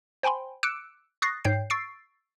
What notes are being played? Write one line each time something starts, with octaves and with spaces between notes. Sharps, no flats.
C5 G5 G#5 B5 C6
D6 E6 F#6 C#7 D7 E7
C#6 D#6 F#6 A6 A#6 C7
G#2 C#5 G5 G6 C7
C#6 E6 A6 C7 D7